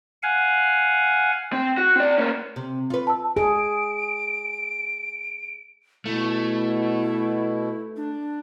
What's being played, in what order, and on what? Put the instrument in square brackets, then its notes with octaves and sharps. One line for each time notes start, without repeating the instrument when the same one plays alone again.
[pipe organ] F5 F#5 G#5
[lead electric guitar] C4
F#4
C4 D5
A#3 C#4
[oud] C3
F4 B4
[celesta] A5 E6
[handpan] G#4 [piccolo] D7
[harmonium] B2 [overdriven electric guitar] A3 [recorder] E4
[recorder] D4